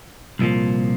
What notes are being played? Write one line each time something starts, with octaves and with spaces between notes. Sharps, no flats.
C2 A#2 F3